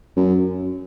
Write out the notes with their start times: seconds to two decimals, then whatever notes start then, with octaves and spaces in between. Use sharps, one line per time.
0.16 F#2